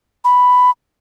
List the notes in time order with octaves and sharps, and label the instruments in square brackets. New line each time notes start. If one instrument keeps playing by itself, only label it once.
[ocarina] B5